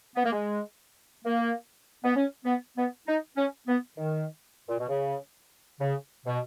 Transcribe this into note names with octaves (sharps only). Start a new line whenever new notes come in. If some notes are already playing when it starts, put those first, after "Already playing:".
B3
A#3
G#3
A#3
B3
C#4
B3
B3
D#4
C#4
B3
D#3
A#2
B2
C#3
C#3
B2